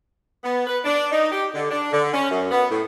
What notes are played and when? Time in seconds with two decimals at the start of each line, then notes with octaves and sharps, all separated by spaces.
0.44 B3
0.67 B4
0.85 D4
1.12 D#4
1.32 G4
1.54 D3
1.71 D4
1.93 D3
2.13 C#4
2.31 F#2
2.51 B3
2.71 A2